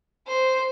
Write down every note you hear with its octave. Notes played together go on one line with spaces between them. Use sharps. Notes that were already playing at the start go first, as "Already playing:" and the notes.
C5